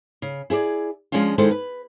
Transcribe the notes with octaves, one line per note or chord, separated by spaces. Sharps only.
C#3
E4 G#4 B4 D5
F3 G3 G#3 C#4 D4 F4
D#3 G#3 E4 A4 C5
B4